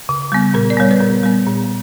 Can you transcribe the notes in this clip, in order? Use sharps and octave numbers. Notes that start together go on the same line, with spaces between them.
C#3
G3 B3
A#2 A#4
D5
G3 B3 C#5
B4
A#2 A#4
G3 B3
A#2